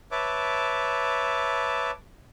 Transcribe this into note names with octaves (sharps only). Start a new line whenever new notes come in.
B4 C#5 E5 A5 D6